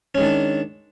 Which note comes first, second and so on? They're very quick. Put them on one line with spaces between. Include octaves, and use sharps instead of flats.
C#4 G#3 D#3 D4